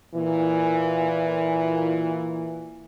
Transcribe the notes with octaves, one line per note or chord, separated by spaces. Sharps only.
A#2 E3